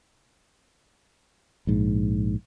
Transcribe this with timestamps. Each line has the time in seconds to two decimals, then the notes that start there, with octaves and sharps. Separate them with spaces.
1.67 A#1 G#2